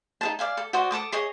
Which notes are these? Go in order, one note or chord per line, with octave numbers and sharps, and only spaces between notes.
D#4 G#4 A5
D5 F5 G#5
A4
F#4 C5 D5 D#5
A4 A5 D6 D#6
G#4 C#5 D#5